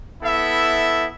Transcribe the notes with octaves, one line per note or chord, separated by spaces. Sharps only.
B3 E4 A4 E5